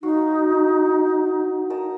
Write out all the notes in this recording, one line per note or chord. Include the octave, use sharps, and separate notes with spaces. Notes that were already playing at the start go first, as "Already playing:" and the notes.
F#3 D#4 F#4 F5
A#4 D#5 A5